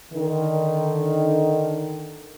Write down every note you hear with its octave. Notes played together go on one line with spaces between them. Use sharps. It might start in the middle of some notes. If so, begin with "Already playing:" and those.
D3 D#3